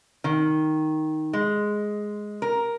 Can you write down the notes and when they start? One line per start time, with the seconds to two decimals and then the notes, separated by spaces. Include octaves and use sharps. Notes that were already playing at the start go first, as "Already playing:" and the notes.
0.24 D#3
1.33 G#3
2.42 A#4